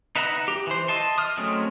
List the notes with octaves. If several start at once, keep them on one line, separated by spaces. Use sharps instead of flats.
D#4 B4 E5 F#5 A#5
G4
E3 C5
D#5 E5 A5 C6
D#6 F6
F#3 G#3 A3 C4 C#4